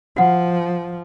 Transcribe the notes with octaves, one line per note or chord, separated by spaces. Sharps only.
F3 F#4 F#5